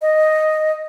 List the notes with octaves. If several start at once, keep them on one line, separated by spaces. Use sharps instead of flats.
D#5